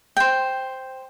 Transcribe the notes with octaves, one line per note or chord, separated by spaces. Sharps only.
C5 G5